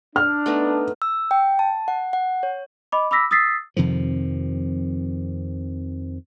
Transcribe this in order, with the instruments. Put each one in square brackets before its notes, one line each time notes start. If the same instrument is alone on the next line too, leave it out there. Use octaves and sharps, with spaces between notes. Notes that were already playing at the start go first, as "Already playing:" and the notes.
[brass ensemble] D4 [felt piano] F6
[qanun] A3 B3 D#4
[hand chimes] E6
G5
A5
F#5
F#5
C#5
[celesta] D#5 B5 D6
B5 D6 E6 A#6 B6
D#6 E6 A6 B6 C7
[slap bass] F2 C3 D#3 F3